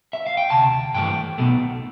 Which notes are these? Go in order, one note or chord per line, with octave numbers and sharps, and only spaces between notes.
E5
F5
G5
D2 C3 A5
G2 E3 A3 G5
B1 B2 A3